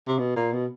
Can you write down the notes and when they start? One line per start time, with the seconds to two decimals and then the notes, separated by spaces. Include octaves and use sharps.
0.07 C3
0.19 B2
0.36 A#2
0.53 B2